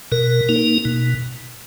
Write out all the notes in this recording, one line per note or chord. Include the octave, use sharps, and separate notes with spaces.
B2 A#4
A#3 D#4
B2